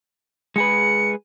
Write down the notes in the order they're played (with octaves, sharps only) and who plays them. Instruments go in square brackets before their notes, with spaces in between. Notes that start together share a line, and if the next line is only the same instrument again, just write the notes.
[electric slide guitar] G#3 G#4 B4 [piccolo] C#7